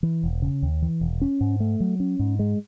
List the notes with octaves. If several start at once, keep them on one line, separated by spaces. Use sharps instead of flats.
E3
E1
C#3
D#2
E3
E1
C#4
G#2
A3
F#3
C#4
G#2
G#3